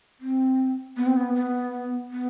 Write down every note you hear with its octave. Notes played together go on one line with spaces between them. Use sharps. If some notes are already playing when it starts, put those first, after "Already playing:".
C4
B3
C4
B3
B3
B3